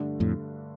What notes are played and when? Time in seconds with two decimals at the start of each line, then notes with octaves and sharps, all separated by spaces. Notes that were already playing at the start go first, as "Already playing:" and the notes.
Already playing: G2 D3 A3 D4
0.20 F2 A2